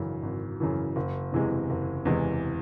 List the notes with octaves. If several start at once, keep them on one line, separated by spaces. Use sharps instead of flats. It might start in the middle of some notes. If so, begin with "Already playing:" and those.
Already playing: G#1 F#2 C#3 E3
G#1
F#2 C#3 E3
F#1
E2 C3 E3 G#3
F#1
E2 C3 E3 G#3